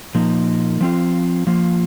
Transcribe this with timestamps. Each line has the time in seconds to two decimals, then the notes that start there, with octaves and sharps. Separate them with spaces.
0.15 A#2 F3 A#3 D#4
0.81 F3 C4 F4
1.47 F3 A#3 F4